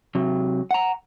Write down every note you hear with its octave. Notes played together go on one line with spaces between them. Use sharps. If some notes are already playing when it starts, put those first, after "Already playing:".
C3 F#3
F#5 A#5